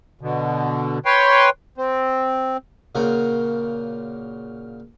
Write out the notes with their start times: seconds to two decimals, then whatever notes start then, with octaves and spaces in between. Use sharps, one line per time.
0.21 B2 D3
1.05 B4 C#5 G5 C6
1.78 C4
2.95 A#2 C#3 F#4 A#4 C5 G5